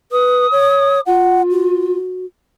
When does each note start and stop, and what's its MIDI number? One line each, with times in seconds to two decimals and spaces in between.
0.12 0.47 71
0.12 1.00 87
0.52 1.00 73
1.06 1.97 65
1.06 1.42 78
1.51 2.26 66